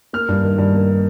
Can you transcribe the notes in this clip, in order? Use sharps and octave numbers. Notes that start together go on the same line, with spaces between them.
A#3 F6
G2
D#3
G2
A#3